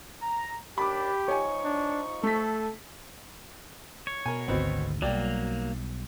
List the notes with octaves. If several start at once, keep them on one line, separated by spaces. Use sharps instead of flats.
A#5
D#2 D4 G4 B5 D6
F3 D#4 C#5 G#5 C#6
D4
A3 A4 B6
C#5
B2 A#4 G#5
G#1 D2 B2 B3 C4
B1 F#3 G3 A#3 D5 G5